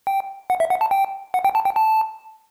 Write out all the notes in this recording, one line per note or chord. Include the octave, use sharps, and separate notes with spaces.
G5
F#5
E5
F#5
A5
G5
F#5
G5
A5
G5
A5